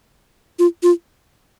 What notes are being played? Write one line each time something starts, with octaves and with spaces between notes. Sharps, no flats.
F4
F4